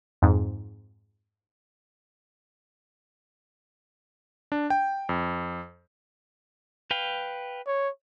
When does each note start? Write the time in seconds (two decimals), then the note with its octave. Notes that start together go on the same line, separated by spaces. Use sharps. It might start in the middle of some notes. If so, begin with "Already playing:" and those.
0.22 F2 G#2
4.52 D4
4.70 G5
5.09 F2
6.91 B4 F5 G5
7.67 C#5